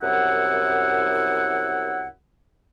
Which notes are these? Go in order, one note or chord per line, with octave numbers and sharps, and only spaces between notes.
C2 F#2 E4 F#5